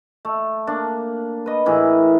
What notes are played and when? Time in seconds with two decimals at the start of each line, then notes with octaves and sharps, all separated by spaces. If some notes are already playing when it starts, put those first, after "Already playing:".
0.25 A3
0.67 A#3 D4
1.46 B4 D#5
1.66 A2 E3 G#4 A#4